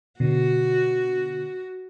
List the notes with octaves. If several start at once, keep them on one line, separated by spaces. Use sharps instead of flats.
B2 D3 F#4